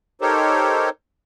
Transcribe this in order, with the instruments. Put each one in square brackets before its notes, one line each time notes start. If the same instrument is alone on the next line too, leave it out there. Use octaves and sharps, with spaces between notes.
[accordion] D#4 G4 A4 A#4 C5 C#5